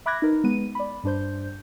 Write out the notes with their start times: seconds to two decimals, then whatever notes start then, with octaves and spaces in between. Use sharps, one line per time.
0.06 E5 B5 D6 F#6 G#6 A#6
0.22 D#4 A#4 B4
0.44 G#3 B3 B4 D#7
0.75 D5 B5
1.04 G2 D4 C5 G6